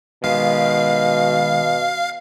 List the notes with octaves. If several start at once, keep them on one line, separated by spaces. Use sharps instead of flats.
B2 D#3 G#3 G4 F5